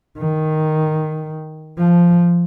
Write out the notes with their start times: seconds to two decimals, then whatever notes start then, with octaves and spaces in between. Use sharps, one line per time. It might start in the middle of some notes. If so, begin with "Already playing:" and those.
0.18 D#3
1.78 F3